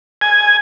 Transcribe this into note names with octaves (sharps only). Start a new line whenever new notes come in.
G#5